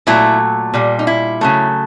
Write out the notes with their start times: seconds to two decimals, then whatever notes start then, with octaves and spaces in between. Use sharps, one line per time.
0.07 A#2 F#3 A3 E4
0.74 A#2 G3
0.99 D#4
1.07 E4
1.41 C#3 F#3 A3